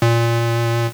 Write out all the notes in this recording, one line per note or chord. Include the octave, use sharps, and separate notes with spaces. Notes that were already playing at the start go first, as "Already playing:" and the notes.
A#2